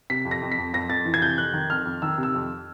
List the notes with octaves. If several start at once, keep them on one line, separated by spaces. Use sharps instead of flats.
C3 B6
F2
A#6
F2
B6
F2
F2 A#6
F2 A6
E3
G#6
C3 G6
F2 F#6
D#3
F2 F6
F2
D#3 E6
C3
E6
F2